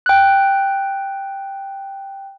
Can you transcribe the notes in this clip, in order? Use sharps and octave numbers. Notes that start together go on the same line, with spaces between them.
G5 F#6